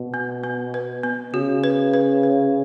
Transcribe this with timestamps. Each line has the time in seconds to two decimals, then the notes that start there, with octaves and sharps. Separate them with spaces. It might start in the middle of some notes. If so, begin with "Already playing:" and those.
Already playing: B2
0.14 B3
0.44 B3
0.74 B4
1.03 B3
1.34 C#3 F#4
1.64 B4
1.94 B4
2.23 B4